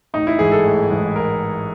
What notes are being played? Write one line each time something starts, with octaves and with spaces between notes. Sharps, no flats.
A1 D#4
E4
G#2 E3 G#4
A4
A1
G#2 E3
A#4